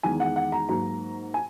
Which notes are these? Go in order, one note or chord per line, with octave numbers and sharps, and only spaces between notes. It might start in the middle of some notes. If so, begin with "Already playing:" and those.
E2 D#3 G#3 G#5
F#5
F#5
A#5
G#2 F#3 A#3 A#5
G#5